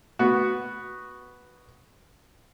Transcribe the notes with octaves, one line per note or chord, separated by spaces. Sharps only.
B3 F#4